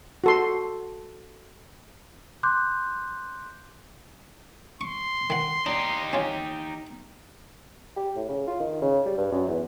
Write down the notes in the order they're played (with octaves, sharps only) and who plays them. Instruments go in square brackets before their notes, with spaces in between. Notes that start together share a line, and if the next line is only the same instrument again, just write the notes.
[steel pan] F#4 A4 C6
[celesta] C6 D6 F#6 G6
[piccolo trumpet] C6 [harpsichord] C#6
[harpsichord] D#3 F#5
[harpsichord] D4 [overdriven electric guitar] D#4 G4
[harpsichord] C#4 F4
[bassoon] G4
A2
C#3
F4
D#3
C#3
G3
G2
F#2
E2